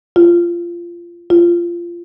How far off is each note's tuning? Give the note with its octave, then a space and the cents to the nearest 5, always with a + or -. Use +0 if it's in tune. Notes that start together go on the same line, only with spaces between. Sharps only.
F4 -20
F4 -20